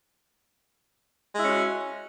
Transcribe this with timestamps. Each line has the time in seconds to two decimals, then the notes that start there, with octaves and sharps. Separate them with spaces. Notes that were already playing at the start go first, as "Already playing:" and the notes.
1.34 G#3
1.39 E4
1.43 C#4
1.47 F#4